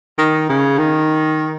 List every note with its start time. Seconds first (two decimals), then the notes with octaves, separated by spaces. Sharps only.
0.18 D#3
0.49 C#3
0.78 D#3